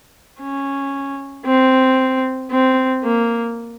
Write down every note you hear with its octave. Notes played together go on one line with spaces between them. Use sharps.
C#4
C4
C4
A#3